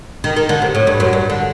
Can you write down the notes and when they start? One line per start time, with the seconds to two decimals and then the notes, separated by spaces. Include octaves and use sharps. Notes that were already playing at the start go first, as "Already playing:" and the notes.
0.24 D#3
0.36 D#3
0.49 D3
0.62 C3
0.75 A2
0.87 G2
1.00 F#2
1.13 G2
1.30 D3